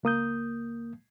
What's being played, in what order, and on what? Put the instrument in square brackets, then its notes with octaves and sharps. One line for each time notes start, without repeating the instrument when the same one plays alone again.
[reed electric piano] C#2 A#3 D#6 G6